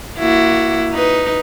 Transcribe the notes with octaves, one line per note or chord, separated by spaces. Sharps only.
A#3 E4 F#4
D#4 B4